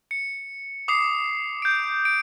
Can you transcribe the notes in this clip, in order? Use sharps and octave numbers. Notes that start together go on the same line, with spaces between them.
C#7
D6 D#6 C7
G6 D7
D7